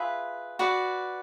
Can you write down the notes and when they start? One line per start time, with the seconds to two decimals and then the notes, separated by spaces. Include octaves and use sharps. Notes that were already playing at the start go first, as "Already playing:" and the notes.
Already playing: F4 G#4 B4 E5
0.59 F#4 B4 D5